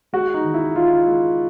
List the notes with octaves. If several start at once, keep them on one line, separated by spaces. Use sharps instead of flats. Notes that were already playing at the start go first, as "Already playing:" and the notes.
G#3 F#4
D#4
D#3
E4
D#3 F4
G#3